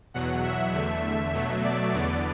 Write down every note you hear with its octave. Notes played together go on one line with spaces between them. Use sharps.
E2 B2 F#3 F#5
E5
E2 D3 A3 E5
E5
B2 F#3 A3
D5
E2 D3 B3 D5